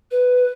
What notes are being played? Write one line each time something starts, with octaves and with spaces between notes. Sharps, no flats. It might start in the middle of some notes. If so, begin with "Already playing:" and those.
B4